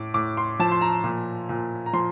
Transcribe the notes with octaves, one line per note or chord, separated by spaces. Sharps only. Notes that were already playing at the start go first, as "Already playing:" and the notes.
Already playing: A2 D6
A2 D6
C6
F3 A5
C6
A#5
A#2
A#2
A#5
F3 C6